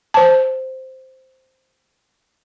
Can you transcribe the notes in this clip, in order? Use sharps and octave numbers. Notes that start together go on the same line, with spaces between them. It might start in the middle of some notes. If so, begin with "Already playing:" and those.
C5 A5